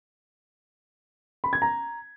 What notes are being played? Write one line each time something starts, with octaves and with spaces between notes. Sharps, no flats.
B5
G#6
A#5